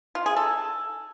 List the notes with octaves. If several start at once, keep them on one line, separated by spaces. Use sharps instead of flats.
F4
G#4
A4